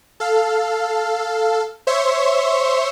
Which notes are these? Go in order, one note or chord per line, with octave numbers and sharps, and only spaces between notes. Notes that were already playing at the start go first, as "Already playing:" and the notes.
A4 F5
C5 C#5 E5 C6 C#6